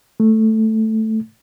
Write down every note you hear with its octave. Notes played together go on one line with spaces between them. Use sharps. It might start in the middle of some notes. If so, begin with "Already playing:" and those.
A3